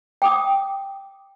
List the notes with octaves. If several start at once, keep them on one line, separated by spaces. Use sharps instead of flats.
G5 D6 D#6